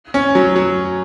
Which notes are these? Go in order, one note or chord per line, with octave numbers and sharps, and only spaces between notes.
C#4
F#3
F#3